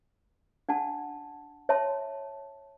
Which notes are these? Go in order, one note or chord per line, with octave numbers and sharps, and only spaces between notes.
D4 F#5 A5
C#5 E5 A5 C6